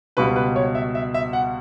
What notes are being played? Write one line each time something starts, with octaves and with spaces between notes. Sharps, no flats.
C#2 B2 G3 B4
B4
C#5
E5
E5
E5
F#5